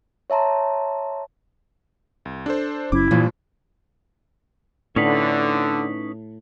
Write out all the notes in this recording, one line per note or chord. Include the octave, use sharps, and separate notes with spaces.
C#5 E5 A5 A#5 C6
C2
D4 A4 C5
F#1 F#2 C#4 E4 D6
G2 A#2 E3 F3
A2 D3 C#4 D#4 B4